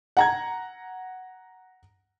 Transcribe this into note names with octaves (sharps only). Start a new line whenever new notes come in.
F#5 A#5 G#6